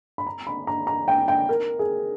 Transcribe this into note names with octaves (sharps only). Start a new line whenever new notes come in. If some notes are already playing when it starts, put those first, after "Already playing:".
B5
A#5
B5
A#5
A#5
G5
G5
A#4
G#4